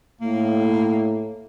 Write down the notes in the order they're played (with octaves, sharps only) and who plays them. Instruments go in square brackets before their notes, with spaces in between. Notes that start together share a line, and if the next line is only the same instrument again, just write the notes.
[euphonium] A2 [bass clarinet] A#3